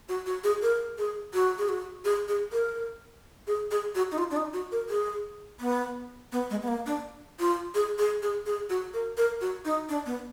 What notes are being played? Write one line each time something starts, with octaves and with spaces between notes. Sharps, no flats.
F#4
F#4
G#4
A#4
G#4
F#4
G#4
F#4
G#4
G#4
A#4
G#4
G#4
F#4
D#4
F4
D4
D#4
F#4
A#4
G#4
B3
B3
G#3
B3
A#3
D4
F4
G#4
G#4
G#4
G#4
F#4
A#4
A#4
F#4
D#4
D4
B3